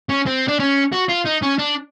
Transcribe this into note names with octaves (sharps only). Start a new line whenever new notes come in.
C#4
C4
D4
C#4
F#4
F4
D#4
C#4
D4